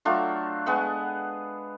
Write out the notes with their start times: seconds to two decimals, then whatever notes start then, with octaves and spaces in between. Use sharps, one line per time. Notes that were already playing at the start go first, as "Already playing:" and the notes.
0.05 F#3 A3 D4 F4
0.66 G#3 B3 F#5